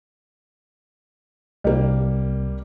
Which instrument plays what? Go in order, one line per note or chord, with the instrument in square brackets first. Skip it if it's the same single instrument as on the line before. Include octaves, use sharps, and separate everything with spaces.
[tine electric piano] C2 [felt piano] G3 A#3